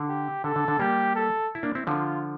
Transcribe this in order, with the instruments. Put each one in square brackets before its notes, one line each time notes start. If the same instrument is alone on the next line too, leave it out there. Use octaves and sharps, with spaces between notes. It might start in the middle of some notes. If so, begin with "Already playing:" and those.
Already playing: [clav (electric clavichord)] D3
[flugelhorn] G4
[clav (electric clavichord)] D3 [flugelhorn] A4
[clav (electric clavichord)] D3
D3
[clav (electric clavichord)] G3 A#3 [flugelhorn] G4
[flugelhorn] A4
[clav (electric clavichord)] E4
A#3 D4
C4 E4
[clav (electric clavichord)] D3 F3 [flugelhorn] F4